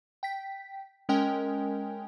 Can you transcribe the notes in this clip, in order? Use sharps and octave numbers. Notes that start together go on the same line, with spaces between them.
G5 B6
G#3 C#4 A#4 D#5 G5 G#5